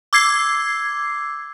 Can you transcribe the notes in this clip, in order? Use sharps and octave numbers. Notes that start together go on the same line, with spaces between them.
D6 E6 G#6 C7